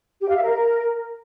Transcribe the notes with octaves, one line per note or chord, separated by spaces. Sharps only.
G4
F5
E5
A#4